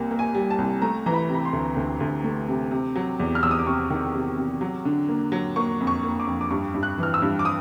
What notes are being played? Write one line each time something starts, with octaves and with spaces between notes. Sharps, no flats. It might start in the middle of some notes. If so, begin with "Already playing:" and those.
Already playing: C2 G3 A#3 G#5
A#3
G#5
G3
A5
C2
A3 A#5
E3 A#5
B5
C3 B5
C6
D2
D2
D2
A3
C3
C3
F#3
E2
F6
E2 E6
D#6
D6
C3 C#6
D#3
C3
C3
F#3
D3
A#3
F#3
A#3 C#6
F2
C#6
A#3
D6
F2
D6
G2 C#6
G2
F#6
E3 F6
E6
G2
D6
D#6